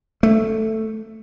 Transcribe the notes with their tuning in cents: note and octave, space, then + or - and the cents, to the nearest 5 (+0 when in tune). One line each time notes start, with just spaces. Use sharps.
A3 +5